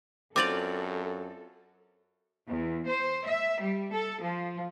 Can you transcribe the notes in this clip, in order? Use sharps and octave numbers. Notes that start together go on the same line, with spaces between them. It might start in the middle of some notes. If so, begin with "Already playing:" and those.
F#2 C4 F4 A4 D5 D6 A6 F#7
E2
C5
E5
G3
A4
F3